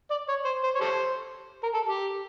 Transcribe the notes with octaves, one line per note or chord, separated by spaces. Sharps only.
D5
C#5
C5
C5
C#5
G4 A4 C5
A#4
A4
G4